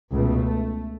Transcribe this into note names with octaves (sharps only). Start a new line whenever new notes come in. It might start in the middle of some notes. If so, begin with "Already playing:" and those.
C#2 B2 A3